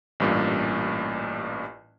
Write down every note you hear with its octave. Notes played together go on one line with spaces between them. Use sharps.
A1 G2 A#2